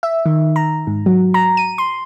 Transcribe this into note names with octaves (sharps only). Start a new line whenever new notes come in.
E5
D#3
A#5
G#2
F#3
A#5
D#7
C6